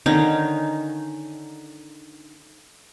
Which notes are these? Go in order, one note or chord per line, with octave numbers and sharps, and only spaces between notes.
D3 D#3 C#4 D#4